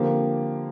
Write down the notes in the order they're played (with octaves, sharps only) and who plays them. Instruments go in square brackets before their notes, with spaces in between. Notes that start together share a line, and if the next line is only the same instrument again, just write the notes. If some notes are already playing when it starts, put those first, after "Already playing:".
Already playing: [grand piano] D3 F3 C4 G4 [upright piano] A#3